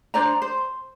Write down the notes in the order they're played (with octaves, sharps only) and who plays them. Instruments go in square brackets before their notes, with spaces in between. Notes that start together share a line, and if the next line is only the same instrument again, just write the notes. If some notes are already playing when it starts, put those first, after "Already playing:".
[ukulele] D4 C5 D5 A#5
C5